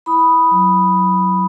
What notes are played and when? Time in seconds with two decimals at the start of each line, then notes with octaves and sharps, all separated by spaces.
0.06 E4 B5 D#6
0.51 F#3
0.95 F#3